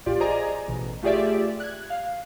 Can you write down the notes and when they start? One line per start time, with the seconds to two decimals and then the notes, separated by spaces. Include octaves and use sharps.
0.06 A1 A2 F4 G4 D5
0.20 G#4 C5 D5 D#5 G#5 A#5
0.68 A1 B2
1.02 A3 F4 G4 G#4 D5 E5
1.60 F#6 G#6
1.90 F5